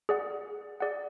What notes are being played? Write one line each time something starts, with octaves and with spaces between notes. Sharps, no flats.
G#4 D5 F#5
G#4 D5 F#5